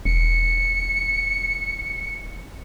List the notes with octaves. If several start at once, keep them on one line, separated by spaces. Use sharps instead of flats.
E1 C#7